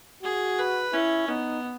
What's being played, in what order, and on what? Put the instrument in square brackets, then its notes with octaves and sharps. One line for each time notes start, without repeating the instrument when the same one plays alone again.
[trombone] F#4 [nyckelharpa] G#4
[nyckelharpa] B4
[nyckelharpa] C#4 [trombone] E4
[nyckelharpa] B3 [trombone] D#4